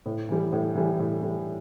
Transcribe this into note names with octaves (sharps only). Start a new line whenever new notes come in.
A2
E3 G3
A2
E3 G3
A2
E3 G3